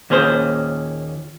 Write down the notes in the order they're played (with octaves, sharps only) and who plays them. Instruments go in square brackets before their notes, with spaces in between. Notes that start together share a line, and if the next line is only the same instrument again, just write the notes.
[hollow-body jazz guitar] D#2 A#2 C#4 G#4 C5